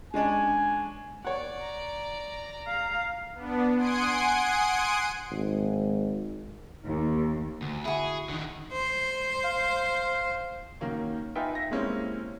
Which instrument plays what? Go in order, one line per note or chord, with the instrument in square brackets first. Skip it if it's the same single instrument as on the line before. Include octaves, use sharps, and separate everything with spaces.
[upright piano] G#3 C#4 D4 [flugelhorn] G#5
[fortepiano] C#5 F#5 [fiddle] D5
[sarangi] A#5
[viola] F5
[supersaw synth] B3 D4
F#5 G#5 C6 D#6 C7 D7
[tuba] G#1
[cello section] D#2
[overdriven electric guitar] D2
[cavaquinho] E4 F#4 [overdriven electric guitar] G#4
[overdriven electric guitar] D3 D#3
[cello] C5
[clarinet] F5
[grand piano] D#3 F#3 A#3 C#4
D#4 F4 B4 E5 G5 G#5
E5 A#6
G3 G#3 A#3 C4 C#4 E4